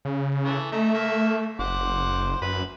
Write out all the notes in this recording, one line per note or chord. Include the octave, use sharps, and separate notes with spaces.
C#3
E3 A3
A3 D#4 E5
A#3 E5
F#1 C5 F#5 D6
F#2 B4